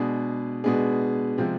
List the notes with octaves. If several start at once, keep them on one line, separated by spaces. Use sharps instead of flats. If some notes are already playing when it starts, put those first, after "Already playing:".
Already playing: B2 G#3 B3 D4 G#4
B2 G#3 B3 D4 G#4
C3 F3 G#3 C4